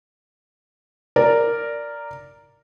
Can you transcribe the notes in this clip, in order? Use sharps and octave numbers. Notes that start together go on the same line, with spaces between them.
A#4 D5